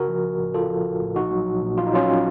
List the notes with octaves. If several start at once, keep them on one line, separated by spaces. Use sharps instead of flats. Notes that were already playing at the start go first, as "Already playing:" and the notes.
Already playing: A#1 C#3 F#4 A#4
F3
A#1
A2
A#1 F4 A4
F3
A#1
A2
A#1 D#4 F#4
F#3
A#1
A#2
A#1 F4
D#4
F#3 C#4 F4